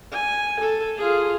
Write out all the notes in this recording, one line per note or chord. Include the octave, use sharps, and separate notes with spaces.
G#5
A4
F4 G#4